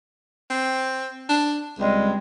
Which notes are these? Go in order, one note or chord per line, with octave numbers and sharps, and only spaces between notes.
C4
D4
C#2 G3 G#3 C4